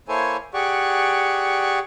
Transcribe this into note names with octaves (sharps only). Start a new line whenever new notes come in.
A#3 E4 A4 C5 C#5 G#5
G4 G#4 D5 F#5 C#6